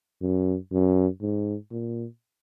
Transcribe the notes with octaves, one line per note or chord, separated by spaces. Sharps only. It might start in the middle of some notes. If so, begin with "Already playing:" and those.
F#2
F#2
G#2
A#2